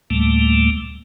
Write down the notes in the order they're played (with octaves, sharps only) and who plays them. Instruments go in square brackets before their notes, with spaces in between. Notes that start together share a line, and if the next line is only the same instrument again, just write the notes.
[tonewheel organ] D2 A2 G3 A3 A#3